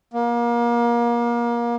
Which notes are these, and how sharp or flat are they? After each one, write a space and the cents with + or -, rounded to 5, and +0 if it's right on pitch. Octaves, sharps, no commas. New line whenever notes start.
A#3 +30